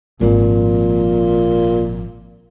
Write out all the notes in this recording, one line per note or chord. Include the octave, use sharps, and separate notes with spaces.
G#1 A#2 F3